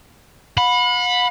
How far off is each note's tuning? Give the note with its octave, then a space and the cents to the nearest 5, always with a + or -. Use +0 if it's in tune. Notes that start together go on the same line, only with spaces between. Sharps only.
F#5 -45 B5 +0